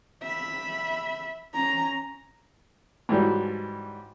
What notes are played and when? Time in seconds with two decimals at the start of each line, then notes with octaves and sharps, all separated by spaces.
0.23 E5 B5
1.55 C#4 A#5
3.09 G#2 E3 F#3 G3